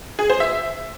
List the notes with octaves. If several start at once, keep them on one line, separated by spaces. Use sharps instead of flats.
G#4
C5
E5